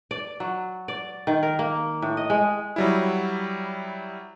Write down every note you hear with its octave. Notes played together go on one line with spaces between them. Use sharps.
D5
F#3
D5
D#3
A#4
A#3
A2
D#5
G#3
F#3 G3 E4